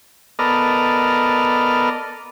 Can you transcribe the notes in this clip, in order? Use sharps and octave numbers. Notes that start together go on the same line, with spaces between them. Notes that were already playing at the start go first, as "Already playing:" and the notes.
B3 A4 A#4 D5 D#5 F6